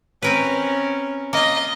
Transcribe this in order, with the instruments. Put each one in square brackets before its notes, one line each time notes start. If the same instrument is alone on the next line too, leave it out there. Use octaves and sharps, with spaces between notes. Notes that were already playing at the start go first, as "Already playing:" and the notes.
[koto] C4 A#4 B4 [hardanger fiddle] C#4
[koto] A#3 F4 [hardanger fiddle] D#5